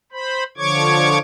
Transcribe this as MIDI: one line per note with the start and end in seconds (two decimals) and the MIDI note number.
0.12 0.44 72
0.12 0.44 83
0.58 1.18 50
0.58 1.18 53
0.58 1.18 73
0.58 1.18 85
0.58 1.18 86
0.58 1.18 92